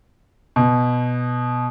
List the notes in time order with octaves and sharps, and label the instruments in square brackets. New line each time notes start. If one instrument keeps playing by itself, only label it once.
[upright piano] B2